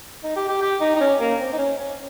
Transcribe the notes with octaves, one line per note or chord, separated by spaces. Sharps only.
D#4
G4
G4
G4
D#4
D#4
C#4
A#3
C4
D#4
C#4
C#4